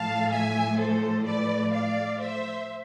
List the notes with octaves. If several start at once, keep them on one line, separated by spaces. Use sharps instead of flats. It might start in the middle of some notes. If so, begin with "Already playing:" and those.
Already playing: A2 F3 A3 F5 A5
E5 G#5
A4 C5
B4 D5
D5 F5
C5 E5